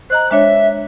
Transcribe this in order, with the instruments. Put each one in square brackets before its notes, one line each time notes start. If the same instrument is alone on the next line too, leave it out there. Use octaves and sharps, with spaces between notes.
[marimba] C5 D#5 A#5 [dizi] F#6
[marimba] G#3 D4 C#5 [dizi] E5